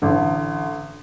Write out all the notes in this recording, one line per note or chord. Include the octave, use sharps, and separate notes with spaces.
A1 D3